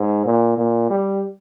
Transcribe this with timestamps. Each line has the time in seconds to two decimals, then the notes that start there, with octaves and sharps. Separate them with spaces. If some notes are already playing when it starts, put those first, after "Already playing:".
Already playing: G#2
0.26 A#2
0.58 A#2
0.90 G3